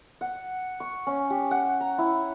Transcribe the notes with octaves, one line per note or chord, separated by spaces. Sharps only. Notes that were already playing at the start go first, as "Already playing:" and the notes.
F#5
C#6
C#4
G4
F#5
A#5
E4